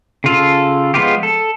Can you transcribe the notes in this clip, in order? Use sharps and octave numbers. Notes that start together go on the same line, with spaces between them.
C#3 F4 A4
F3 G#3 B3 F4 G4
A4